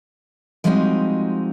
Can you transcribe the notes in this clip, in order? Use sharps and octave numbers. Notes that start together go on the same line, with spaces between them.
F3 G3 G#3 C4 D#4 F#4